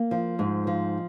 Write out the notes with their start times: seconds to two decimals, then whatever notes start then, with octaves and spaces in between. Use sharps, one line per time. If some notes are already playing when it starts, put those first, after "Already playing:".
Already playing: A#3
0.11 F3
0.39 G#2
0.67 F3